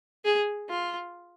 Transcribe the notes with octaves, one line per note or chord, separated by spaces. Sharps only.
G#4
F4